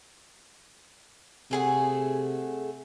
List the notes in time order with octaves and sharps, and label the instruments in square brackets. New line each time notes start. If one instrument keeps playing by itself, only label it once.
[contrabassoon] C3 [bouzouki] A3 G#4 F#5